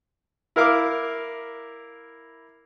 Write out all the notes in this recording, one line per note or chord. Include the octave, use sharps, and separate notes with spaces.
E4 A#4 F5 D6